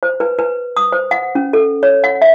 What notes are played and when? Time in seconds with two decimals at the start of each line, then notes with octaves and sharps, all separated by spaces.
0.03 C5
0.20 B4
0.39 B4
0.77 D#6
0.92 C5
1.11 F#5
1.35 C#4
1.53 A4
1.83 C#5
2.04 F#5
2.22 E5